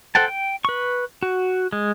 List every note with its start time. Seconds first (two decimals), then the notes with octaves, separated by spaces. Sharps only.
0.15 A4 C5 F#5 G5 A5
0.28 G5
0.65 B4 C#6
1.23 F#4
1.73 G#3